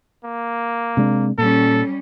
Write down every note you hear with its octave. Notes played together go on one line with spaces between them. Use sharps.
A#3
C3 G#3 D4
A#2 G3 C#4 A4